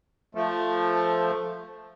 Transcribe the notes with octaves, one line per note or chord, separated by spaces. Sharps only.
F3 A3